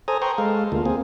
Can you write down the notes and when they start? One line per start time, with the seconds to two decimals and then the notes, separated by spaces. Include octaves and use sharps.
0.08 A4 C5 G#5 A#5 D#6
0.22 B4 G5 A#5 C6 C#6
0.38 G#3 A4 F5
0.72 D2 A#3 F4
0.85 A#3 C4 G#4